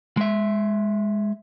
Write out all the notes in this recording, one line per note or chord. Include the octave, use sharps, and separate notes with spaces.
G#3 E5